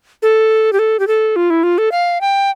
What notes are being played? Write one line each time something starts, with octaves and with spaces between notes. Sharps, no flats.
A4
G4
A4
G4
A4
F4
E4
F4
A4
F5
G5